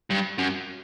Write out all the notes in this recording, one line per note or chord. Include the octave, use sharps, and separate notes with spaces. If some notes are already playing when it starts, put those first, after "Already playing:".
G2
F#2